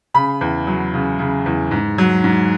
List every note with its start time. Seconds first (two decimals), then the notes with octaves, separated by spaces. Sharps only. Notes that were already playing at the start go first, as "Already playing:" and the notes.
0.14 C#3 B5
0.41 E2
0.67 F#3
0.94 C#3
1.19 C#3
1.46 E2
1.71 G#2
1.98 F#3
2.24 G#2